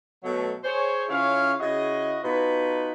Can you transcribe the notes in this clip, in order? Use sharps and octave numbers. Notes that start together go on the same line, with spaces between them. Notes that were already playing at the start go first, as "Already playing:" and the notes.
B2 F#3 A3
G#4 C5 C#5
C#3 C#4 E4 F4 C#5 F5
C#3 E4 F#4 G#4 D#5
B2 D#4 F4 B4